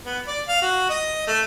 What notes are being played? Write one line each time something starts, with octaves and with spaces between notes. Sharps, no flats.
B3
D5
F5
F#4
D#5
A3